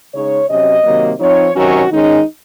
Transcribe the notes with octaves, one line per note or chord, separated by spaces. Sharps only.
C#3 G#3 D#4 C#5
C3 F#3 C#4 D#5
C3 D#3 F#3 A#3
F3 C4 D#4 C#5
C3 D#3 F#3 C#4 F#4
D#3 G#3 C#4 D#4